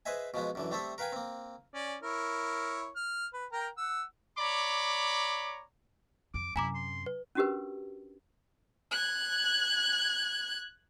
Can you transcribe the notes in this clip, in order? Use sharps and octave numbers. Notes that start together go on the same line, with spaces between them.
G#4 B4 C5 D#5 E5 G#5
B2 F3 G#3 B3
F#2 D3 E3
G3 A3 C4 A4 E5
A#4 B4 F5 G5 G#5
A#3 C4
C#4 D5
E4 A#4 C#5
F6
B4
A#4 G5 A#5
F#5 E6
C#5 D5 A#5 B5 D6
F2 D6
F#2 C3 E4 G#5 A#5 D6
C6
B4
C#4 D4 F#4 G4 A#4 B4
F#6 G#6